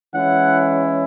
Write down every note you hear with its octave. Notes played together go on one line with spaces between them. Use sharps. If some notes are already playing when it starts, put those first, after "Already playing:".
E3 G#3 C#4 E4 F#5